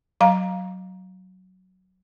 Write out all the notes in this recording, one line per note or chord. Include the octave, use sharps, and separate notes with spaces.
F#3 F5 A#5